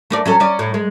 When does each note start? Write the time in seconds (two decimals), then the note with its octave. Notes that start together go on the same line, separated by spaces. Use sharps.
0.10 A3 A#4 D5
0.26 F#3 C#4 A4
0.40 C#4 D5
0.59 A2
0.74 G#3